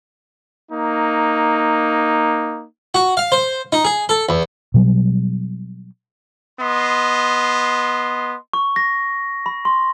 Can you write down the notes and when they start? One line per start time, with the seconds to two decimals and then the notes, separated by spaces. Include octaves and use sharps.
0.72 A#3 D#4
2.95 F#4
3.17 F5
3.32 C5
3.72 D#4
3.85 G#4
4.09 A4
4.29 E2
4.74 B2 F#3 G3
6.60 B3 D#5 C6
8.53 C#6
8.76 A#6
9.46 B5
9.65 C6